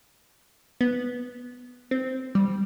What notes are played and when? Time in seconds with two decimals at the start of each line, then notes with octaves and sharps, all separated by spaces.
0.81 B3
1.91 C4
2.35 G3